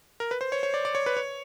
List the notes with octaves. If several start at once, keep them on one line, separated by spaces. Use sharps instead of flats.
A#4
B4
C5
C#5
C#5
D5
D5
C#5
B4
C#5